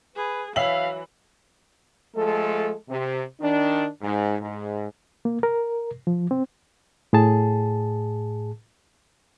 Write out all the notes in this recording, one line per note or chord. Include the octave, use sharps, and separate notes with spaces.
G#4 B4
E3 F#3 E5 F5 F#7
F3 G#3 A3 A4
C3
D#3 D4
G#2
G#2
A#3
A#4
F3
C4
A2 G#4 A5